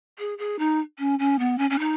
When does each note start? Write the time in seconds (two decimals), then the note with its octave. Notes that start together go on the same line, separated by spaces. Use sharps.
0.19 G#4
0.38 G#4
0.59 D#4
0.99 C#4
1.19 C#4
1.39 B3
1.58 C#4
1.70 C#4
1.79 D#4